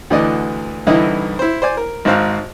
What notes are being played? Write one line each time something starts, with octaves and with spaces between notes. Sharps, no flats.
D2 D3 E3 D5 D#5
C2 D3 E3 D#4 E4 D#5
E4 C5
C5 D5 G#5
A#4
G#1 G#2 C5 F5 F#6